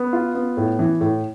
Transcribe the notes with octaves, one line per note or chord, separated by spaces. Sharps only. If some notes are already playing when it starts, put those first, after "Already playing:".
Already playing: B3
F4
B3
A2
E3
A2